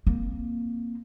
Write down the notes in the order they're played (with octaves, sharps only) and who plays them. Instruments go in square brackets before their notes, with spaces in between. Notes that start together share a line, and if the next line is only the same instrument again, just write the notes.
[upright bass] A#3 C4